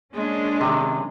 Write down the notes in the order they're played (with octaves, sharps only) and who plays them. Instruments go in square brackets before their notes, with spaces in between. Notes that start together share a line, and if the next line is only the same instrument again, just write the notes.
[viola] G#3 [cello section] A#3 C#4 D4
[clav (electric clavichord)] C3 D#3